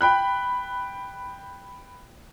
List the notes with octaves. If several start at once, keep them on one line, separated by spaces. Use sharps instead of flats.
G5 B5 F#6